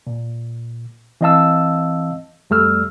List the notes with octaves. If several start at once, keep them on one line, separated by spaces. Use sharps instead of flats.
A#2
E3 C4 D#5 F5 A5 E6
F2 G3 A3 E6 F6